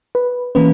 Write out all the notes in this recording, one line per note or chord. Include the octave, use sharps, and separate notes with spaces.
B4
E3 A#3 C#4 B4